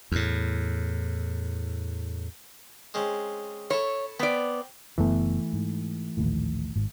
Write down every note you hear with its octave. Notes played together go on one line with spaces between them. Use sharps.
E2 A2
G#3 C4 C#4
E4 A4 C#5
B3 C4 D5
F#1 F#2 E3 A3 B3
G#2
A#1 D#2 A2
G#1 G#2